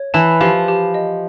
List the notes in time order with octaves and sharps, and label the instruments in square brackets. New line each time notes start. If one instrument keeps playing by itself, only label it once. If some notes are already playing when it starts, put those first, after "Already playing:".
Already playing: [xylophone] C#5
[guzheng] E3 [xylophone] A5
[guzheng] F3 [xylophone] G4
[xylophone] G4
D#5